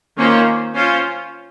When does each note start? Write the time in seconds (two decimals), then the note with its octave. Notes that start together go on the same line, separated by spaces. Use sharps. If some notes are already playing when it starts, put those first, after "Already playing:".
0.17 D#3 A#3 C#4 F4 C5
0.75 C#4 F4 C5